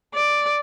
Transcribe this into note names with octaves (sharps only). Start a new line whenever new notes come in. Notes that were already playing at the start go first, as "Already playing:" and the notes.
D5